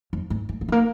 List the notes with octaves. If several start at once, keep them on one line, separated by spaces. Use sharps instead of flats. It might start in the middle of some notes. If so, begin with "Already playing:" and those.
F2
G#2
G#3
A#3
G#3
A#3